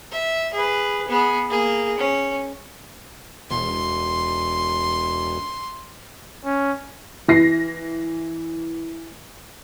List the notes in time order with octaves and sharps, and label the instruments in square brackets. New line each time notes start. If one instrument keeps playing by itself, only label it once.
[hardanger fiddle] E5
G#4 B4
B3 G#4
A#3 G#4
C#4
[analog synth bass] E1 [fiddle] C6
[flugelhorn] C#4
[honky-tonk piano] E3 A#6 C7